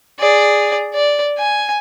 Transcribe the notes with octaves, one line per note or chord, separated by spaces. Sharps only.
G#4 D5
D5
G#5